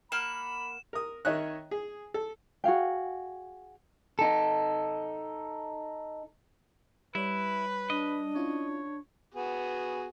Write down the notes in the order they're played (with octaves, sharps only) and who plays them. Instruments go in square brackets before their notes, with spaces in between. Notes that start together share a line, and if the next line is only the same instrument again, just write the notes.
[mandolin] A#3 F#5 F6 [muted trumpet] B5 [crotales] E7
[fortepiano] A#4 D#6
D#3 C#5 D#5 E5 F#6
G#4
A4
[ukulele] F#4 G#4 F5 G5
[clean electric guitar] D#4 A4
[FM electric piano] G3 C#5 [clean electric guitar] E4 [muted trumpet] B4
[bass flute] D4 [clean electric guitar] D#5
[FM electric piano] C#4 E4 F4 [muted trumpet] C#5
[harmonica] B3 F#4 G#4